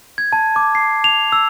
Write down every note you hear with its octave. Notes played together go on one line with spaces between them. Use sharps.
G#6
A5
D6
C7
F7
E6